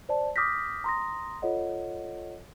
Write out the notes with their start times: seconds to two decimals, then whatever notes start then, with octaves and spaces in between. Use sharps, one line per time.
0.09 C5 D5 A5
0.36 D6 D#6 F6 G6 A#6 B6
0.84 A#5 C6 D#6 A#6
1.42 F4 A4 C#5 D#5 F#5